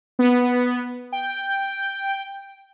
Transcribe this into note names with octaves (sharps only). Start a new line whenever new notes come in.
B3
G5